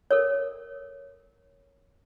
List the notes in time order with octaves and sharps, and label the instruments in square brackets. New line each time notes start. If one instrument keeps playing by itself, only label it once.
[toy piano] A4 A#4 C#5